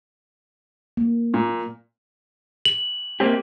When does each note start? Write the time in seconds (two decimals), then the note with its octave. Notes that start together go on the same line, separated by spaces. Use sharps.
0.97 A#3
1.34 A#2
2.65 F#7
3.20 A#3 C4 G4